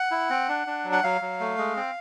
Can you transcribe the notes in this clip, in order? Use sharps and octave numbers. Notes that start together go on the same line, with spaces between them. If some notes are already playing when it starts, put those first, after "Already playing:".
Already playing: F#5
E4
C4
D4
D4
F#3
F#5
F#3 F5
F#3
A3
G#3
C4